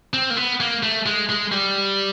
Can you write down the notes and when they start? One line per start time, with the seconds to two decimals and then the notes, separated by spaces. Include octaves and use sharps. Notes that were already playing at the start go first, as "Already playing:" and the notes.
0.14 C4
0.30 A#3
0.37 B3
0.60 A#3
0.83 A3
1.06 G#3
1.29 G#3
1.52 G3